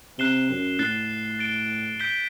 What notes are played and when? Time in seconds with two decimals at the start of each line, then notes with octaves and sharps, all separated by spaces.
0.18 C3 F#6 C7 E7 G7
0.50 F#2
0.79 A2 F#6 A6 C7 G7
1.39 A6 D7 G7
2.00 G6 B6 D7 G7